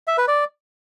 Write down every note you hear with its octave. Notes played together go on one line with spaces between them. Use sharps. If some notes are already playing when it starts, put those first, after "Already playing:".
E5
B4
D5